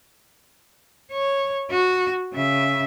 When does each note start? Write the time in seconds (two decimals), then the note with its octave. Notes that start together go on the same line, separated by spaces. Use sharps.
1.12 C#5
1.71 F#4
2.33 C#3 E5